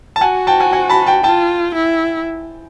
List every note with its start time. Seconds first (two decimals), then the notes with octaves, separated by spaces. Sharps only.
0.16 A5
0.21 F#4 F#5 G#5
0.47 G5 A5
0.60 F#5 G#5
0.73 F#5 G#5
0.89 A5 B5
1.07 G5 A5
1.23 F4 G5 A5
1.75 E4